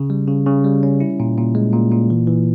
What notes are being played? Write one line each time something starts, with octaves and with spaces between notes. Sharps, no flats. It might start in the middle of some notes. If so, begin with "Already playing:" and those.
Already playing: C#3
G3
C#3
C#3
G3
C#4
E4
A#2
A#2
G#3
A#2
A#2
E3
E3